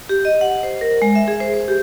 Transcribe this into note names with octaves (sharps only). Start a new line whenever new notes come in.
G4
D#5
F#5
C5
A#4
G#3
E5
G#4
C5
C5
G4